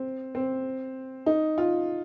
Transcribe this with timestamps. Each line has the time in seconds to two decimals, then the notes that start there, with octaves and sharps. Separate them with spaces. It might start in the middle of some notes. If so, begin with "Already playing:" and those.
Already playing: C4
0.35 C4
1.26 D#4
1.58 F4